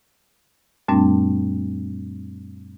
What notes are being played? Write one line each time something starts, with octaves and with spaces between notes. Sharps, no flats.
F#2 A#2 G3 A3 C4 D4